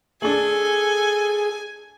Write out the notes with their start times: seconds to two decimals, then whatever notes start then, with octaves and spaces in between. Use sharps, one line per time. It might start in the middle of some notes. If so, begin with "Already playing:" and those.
0.22 A3 D4 G#4 A4 G#5